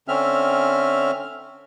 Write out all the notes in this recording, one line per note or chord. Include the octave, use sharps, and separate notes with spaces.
D3 C4 C#4 E5 F6